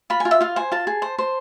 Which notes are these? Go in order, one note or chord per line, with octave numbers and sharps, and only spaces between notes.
F4 B5
G#5
F4
E5
F4 F5
C5 G#5
F4 A5
G#4
C5
C5